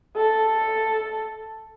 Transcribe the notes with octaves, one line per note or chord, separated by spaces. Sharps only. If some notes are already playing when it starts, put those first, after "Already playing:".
A4